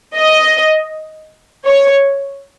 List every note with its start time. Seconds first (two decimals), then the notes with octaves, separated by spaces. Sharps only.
0.16 D#5
1.67 C#5